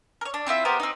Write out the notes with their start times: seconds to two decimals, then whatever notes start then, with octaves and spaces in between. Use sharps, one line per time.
0.21 A#4 C#5
0.34 D4
0.47 C4 E4 F4 E5
0.65 B3 G4 A#4 C5
0.80 C4 D#4